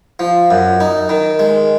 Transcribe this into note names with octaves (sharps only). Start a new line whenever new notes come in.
F3
F#2
D#4
D#3
G#3